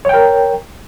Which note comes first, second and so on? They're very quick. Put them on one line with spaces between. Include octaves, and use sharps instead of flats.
C#5 G5 A#4